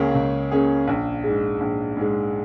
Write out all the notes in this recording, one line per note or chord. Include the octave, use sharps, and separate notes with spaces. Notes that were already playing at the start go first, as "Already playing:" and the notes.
Already playing: C#2 C#3 A#3 C#4 G#4
C#2
C#3 A#3 C#4 G#4
A#1
G#2 G#3
A#1
G#2 G#3